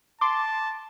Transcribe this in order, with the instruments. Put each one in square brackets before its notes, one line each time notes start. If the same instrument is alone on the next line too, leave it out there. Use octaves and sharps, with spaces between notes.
[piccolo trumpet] A5 [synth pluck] C6 D6